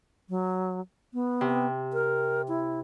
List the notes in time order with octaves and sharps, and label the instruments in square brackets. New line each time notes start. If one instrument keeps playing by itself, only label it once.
[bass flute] F#3
B3
[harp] C3
[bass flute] A#4
E4